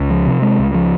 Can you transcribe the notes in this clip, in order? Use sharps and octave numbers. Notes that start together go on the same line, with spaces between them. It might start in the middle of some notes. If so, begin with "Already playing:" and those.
Already playing: C#2
F3
C3
G#3
C#2
F3